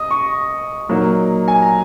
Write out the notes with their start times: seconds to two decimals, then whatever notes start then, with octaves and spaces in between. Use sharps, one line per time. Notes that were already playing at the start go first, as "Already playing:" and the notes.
Already playing: D#5 D#6
0.11 C#6
0.89 A#2 F#3 A#3 D#4
1.48 G#5
1.62 A#5